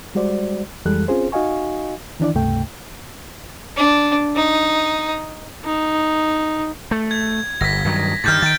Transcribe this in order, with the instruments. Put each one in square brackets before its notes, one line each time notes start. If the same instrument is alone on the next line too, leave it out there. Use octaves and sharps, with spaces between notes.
[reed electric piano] G3 G#3 F#4 C5 D5
F2 E3 G3 G#3 A4 F#6
C4 C#4 F4 G#4 C5
D#4 F#4 D#5 F5 G#5 C#6
D#3 E3 D4 E4 D5
C#2 G2 C3 A3 G5
[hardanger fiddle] D4
D#4
[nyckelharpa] D#4
[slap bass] A3
[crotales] G#6
[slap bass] G1 [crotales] A#6 B6
[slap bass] G2 D#3 F#3
[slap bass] G2 D#3 [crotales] F6 G6 A6
[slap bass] D#3 [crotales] A6 D7